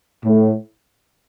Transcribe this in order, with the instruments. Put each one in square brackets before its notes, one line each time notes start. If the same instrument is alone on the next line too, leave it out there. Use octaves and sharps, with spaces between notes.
[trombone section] A2